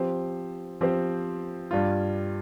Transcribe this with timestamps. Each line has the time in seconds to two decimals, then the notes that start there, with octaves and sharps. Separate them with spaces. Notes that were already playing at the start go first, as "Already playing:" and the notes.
Already playing: F3 C4 G4 C5
0.81 F3 C4 G4 C5
1.71 G2 G3 F4